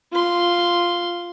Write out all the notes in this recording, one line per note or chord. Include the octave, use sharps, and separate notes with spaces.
F4 C6